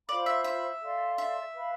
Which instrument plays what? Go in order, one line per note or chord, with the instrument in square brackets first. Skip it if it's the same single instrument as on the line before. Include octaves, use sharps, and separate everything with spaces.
[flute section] F4 C5 F5 B5 [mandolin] D5
[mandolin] E5
E5
[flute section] A4 D5 F5 C6
[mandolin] E5
[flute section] B4 F5 B5